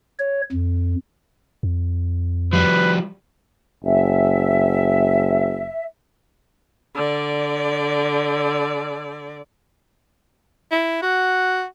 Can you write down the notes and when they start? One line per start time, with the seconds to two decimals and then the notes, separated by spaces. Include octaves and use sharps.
0.19 C#5
0.53 F2
1.63 F2
2.53 F3 G3 B4
3.84 F#1 E5
6.95 D3 D5
10.72 E4
11.02 F#4 F#5